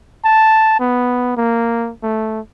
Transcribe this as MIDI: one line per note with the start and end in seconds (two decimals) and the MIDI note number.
0.25 0.77 81
0.80 1.36 59
1.37 1.92 58
2.03 2.40 57